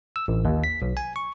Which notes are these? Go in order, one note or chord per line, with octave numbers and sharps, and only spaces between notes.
E6
A1
D#2
B6
B1
G#5
C#6